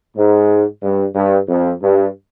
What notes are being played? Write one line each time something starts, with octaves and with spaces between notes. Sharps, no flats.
G#2
G2
G2
F2
G2